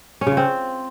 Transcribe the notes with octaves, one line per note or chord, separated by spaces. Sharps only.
C#4
C#3
F4
C4